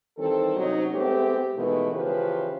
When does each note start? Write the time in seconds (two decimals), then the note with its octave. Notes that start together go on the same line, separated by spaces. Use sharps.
0.18 D#3 E3 G3 C4 A4
0.56 C3 F#3 C#4 D#4
0.93 G#3 A3 B3 C4 G4
1.57 B2 D#3 E3 G#3 A3 B3
1.92 C#3 E3 F3 G4 B4 C5